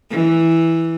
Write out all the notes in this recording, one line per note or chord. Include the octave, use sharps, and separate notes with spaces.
E3